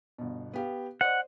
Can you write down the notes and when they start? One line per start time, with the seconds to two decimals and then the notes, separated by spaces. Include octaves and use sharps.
0.18 G1 B2
0.53 B3 G4 F5
1.01 C5 D5 D#5 F#5